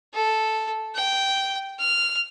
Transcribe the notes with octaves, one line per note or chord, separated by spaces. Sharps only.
A4
G5
F6